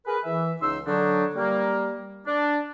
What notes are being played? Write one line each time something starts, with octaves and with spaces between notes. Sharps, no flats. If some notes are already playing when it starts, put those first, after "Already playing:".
G#4 A#4 B4
E3 E5
C#2 D#4 C6 E6
D3 F#3 D4 D#4 C#5
G3 A#3
D4